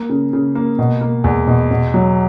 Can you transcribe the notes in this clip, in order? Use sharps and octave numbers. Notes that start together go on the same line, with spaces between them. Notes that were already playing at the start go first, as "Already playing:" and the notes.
Already playing: A#3
C#3
C#3
A#3
B2
A#3
E2
B2
B2
F#3